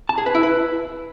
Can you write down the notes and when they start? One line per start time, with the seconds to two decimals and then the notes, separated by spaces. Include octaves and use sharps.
0.09 A5
0.18 G#4
0.26 B4
0.35 E4
0.43 B4